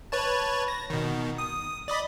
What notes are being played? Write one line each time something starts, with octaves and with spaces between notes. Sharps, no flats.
B4 C#5 A5
A#6
B2 D#3
D#6
D5 D#5 B5